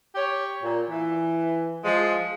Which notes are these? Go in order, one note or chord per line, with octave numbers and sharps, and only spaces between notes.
G4 C#5
A#2
E3
F3 G#3